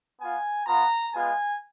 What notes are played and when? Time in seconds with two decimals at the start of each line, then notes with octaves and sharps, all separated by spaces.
0.19 B3 F4 G#5
0.67 B3 F4 A#5
1.14 G#3 B3 F4 G#5